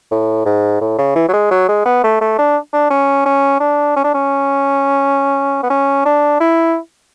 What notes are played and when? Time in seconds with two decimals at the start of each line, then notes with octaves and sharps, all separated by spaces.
0.11 A2
0.46 G#2
0.82 A2
0.99 C#3
1.16 E3
1.29 F#3
1.33 G#3
1.51 F#3
1.68 G#3
1.86 B3
2.04 A3
2.21 A3
2.39 D4
2.73 D4
2.91 C#4
3.26 C#4
3.60 D4
3.96 C#4
4.04 D4
4.14 C#4
5.63 B3
5.70 C#4
6.06 D4
6.40 E4